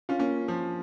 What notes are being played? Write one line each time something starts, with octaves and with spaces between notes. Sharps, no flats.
C#4 F4
A#3 C#4
F3